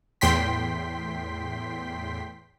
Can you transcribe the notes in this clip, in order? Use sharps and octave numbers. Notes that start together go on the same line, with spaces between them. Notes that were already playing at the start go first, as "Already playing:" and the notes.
E2 A2 G5 C6 B6